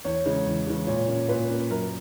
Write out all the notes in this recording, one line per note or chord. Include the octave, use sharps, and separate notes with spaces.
E2 C#5
C#3 E3 G#3
E2
C#3 E3 G#3
A#2 C#5
A#3 C#4
A#2 B4
A#3 C#4
F#2 A#4